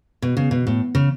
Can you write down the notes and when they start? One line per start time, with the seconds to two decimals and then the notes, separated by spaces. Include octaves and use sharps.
0.22 B2
0.37 C#3
0.51 B2
0.67 A2
0.95 C#3